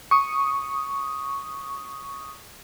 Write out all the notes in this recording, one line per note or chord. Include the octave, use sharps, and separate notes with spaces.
C#6 D#6